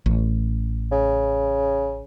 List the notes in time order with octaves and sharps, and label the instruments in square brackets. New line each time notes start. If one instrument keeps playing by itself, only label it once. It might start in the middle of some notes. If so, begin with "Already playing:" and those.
[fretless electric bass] A1
[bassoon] C#3